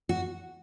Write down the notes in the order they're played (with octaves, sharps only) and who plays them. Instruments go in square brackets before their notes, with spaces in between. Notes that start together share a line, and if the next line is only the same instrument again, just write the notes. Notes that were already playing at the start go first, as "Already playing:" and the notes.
[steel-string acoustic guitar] F#4